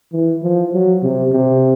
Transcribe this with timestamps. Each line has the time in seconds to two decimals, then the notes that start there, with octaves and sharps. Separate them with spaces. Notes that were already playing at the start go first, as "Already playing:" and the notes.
0.13 E3
0.43 F3
0.73 F#3
1.03 C3
1.32 C3